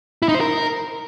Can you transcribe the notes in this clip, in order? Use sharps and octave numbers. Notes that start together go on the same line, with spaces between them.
E4
D#4
C5
A#4